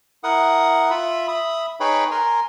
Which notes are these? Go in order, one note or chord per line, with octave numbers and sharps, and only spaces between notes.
E4 A#4 F#5 D#6
F4 E5 B5
E5 B5 D#6
D#4 G#4 B4 C#5 G5 B5
A#4 G#5 A#5 C6